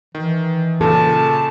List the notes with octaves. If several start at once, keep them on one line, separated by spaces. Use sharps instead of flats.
D#3 E3
A#2 C#3 A4 A5